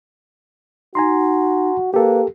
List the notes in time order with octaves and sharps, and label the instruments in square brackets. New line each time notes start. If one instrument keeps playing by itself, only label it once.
[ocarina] D#4 [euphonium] F#4 [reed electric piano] G#5 A#5 C6
[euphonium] A#3 [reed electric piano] G4 A4 [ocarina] B4